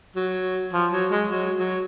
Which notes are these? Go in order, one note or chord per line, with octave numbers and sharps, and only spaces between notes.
F#3
F3
F#3
G#3
F#3
F#3